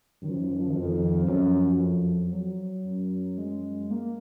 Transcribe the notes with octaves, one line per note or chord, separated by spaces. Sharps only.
F#2 D#3
F3
D#3
F3
D#3
F3
D#3
F2 F3
D#3
F#2 F3
F2
F#3
F#2
G#3
A#3